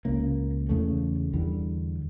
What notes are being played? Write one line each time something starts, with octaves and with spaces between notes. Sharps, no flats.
C#2 C#3 A#3
E2 C#3 A3
E2 D3 G3